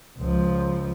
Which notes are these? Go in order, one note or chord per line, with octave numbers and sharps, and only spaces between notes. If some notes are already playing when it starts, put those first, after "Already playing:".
C#2 F3